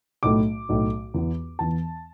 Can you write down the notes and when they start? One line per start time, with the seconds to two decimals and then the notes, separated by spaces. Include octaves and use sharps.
0.23 B1 A2 A3 D6
0.69 B1 A2 A3
1.14 E2 E3 B3
1.59 E2 E3 B3 A5